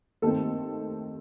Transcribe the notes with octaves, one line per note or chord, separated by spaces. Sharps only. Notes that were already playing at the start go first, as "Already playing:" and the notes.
D#2 D#3 A3 C4 A4